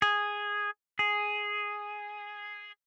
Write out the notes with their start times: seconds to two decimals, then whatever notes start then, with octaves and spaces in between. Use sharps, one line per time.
0.02 G#4
0.99 G#4